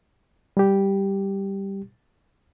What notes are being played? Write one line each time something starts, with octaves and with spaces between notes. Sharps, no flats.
G3 G4